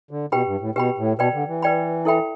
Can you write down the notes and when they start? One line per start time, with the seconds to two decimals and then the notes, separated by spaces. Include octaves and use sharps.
0.11 D3
0.32 B2 G4 B4 G5 B5
0.46 G2
0.60 A2
0.75 B2 G4 B4 G5 B5
0.98 A2
1.19 B2 B4 D5 G5 B5
1.34 D3
1.48 E3
1.62 B4 D5 G5 B5
2.05 E4 A4 E5 G5 B5